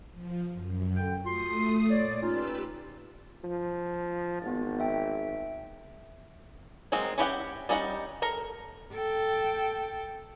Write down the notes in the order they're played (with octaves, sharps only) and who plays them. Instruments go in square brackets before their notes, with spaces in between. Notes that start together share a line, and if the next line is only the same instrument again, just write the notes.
[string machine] F3
F#2
[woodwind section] D3 G5
[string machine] A3 D#6 C7 [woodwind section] F4 F#4 C6
[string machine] A#2 [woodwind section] C#5 D5
[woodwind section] C#4 D#4 F4 [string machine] G4 B4 E6
[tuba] F3
[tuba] G#1 [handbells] B3 A6
[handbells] E5 G5
[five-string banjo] F#3 G#3 A#3 C4
C#4 E4 G4 F#5
G3 C#4 D#4 D#5 F#5
A4 A#4 A#5
[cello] A4 G5